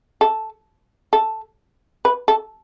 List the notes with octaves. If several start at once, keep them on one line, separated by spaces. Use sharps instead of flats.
A4
A4
B4
A4